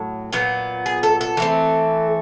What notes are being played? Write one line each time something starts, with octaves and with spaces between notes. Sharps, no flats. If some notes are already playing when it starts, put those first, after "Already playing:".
Already playing: A2 F#3
A#2 F#3 B3
G#4
A4
A4
E3 A3 C4